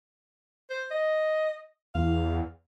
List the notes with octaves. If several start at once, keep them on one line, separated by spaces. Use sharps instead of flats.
C5
D#5
E2 F5